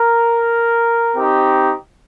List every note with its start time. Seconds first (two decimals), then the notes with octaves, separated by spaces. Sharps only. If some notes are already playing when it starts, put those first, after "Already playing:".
Already playing: A#4
1.16 C4 D#4 G4